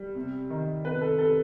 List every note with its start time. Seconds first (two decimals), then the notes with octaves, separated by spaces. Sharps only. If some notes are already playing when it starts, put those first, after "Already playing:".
Already playing: G3
0.15 C3
0.50 D#3
0.85 C3 B4
1.01 A4
1.18 C3 A4